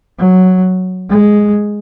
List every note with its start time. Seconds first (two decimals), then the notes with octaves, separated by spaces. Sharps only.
0.19 F#3
1.09 G#3